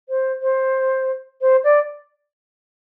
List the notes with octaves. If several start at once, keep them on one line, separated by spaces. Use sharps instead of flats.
C5
C5
C5
D5